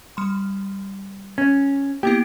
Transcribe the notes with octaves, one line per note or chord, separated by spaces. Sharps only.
G3 C6
C#4
A#3 B3 E4 G4